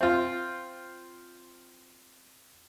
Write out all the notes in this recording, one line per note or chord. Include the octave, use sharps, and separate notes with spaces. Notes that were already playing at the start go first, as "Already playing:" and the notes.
C4 F4